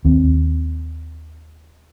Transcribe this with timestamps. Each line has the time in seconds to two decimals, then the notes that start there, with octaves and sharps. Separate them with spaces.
0.05 D#2 C4